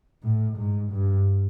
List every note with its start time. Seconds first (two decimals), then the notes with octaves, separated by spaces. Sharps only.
0.23 A2
0.57 G#2
0.92 G2